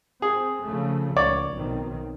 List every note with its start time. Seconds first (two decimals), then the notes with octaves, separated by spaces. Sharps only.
0.22 C4 G#4
0.64 C#3 F3 A3
1.17 C#2 C#5 D5 D6
1.54 B1 D#3 C4